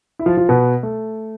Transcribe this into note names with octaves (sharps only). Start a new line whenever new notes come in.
E4
F3 F4
F3 F4
B2 B3
A3